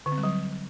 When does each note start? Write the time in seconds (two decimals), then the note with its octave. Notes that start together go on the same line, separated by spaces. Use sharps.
0.06 D3
0.12 C4
0.18 G3
0.24 F#3